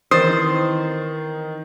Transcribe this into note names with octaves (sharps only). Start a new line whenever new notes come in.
D#3 E3 C4 C5 D#6 A6